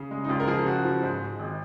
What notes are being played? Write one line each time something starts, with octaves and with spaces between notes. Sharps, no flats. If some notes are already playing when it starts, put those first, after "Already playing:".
Already playing: C#3
G#3
D#4
C#2 F4
A#4
F3 G#4
C#3 F#4
F3
G#2
G#3
G#1